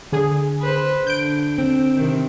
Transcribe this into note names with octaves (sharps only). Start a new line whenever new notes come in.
D3 G#4
B4 C5
D3 G6 D7
C4
C3 D#3